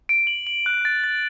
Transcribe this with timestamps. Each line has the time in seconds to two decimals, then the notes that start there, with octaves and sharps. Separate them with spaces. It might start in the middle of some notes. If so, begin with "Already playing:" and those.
0.09 D7
0.27 F#7
0.47 F#7
0.66 F#6
0.85 A6
1.04 A6